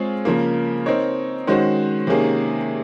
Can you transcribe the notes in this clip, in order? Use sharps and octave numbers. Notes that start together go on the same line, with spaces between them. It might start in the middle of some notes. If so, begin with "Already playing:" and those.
Already playing: G#3 C4 F4 G#4 C#5
C#3 F3 A#3
C4 D#4 A#4 C#5
D#3 G#3 C#4 F#4 C5
C3 D#3 A#3 C#4 G#4